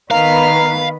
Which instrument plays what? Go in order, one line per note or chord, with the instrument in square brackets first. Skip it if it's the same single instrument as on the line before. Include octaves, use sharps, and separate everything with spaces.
[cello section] D#3 B3 B4 [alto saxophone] A#4 [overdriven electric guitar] F5